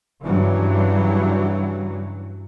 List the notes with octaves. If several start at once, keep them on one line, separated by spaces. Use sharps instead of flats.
G2 C#3 E3 F#3